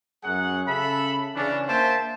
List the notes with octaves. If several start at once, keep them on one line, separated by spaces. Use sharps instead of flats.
F#2 F#3 G#4 F#5
C#3 A4 E5 B5
C#3 E3 C#4 D4
A#3 C5 E5 G5 A5